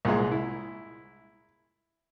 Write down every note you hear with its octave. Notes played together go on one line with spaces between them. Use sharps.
C2 A#2 G#3
E4